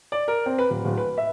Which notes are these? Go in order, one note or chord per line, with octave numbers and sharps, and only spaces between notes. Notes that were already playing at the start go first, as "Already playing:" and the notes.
D5
A#4
C4
B4
D1
D1
B4
E5